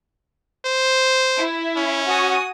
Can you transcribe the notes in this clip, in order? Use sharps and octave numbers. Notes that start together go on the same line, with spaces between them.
C5
E4
C#4
F#4 G#5 D#6